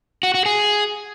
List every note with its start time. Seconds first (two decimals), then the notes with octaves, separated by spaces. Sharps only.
0.23 F#4
0.34 F#4
0.46 G#4